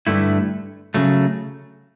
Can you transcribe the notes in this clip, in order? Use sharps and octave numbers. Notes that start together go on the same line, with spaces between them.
G2 D3 A3 E4
C#3 F#3 A3